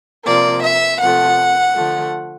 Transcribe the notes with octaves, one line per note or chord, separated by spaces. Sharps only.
C3 F3 A#3 D5
E5
C3 F3 A3 F#5
D3 F3 A3